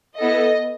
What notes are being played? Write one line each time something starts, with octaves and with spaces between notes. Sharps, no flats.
B3 E4 A4 D#5